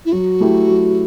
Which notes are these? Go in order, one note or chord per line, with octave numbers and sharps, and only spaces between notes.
E4
F#3 F#4
A3 E4 G4
F#3